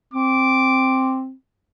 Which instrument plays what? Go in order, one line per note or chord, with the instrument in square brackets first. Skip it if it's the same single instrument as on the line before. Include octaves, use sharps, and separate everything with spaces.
[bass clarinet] C4 [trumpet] D6